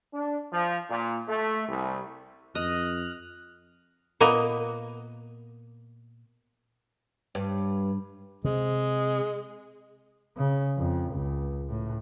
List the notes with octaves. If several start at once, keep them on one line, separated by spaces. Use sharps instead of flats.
D4
F3
A#2
A3
C2
F2 D#5 F6 F#6
A#2 A#3 B3 D#5
G2
C3 G#3
C#3
F2
C#2
A2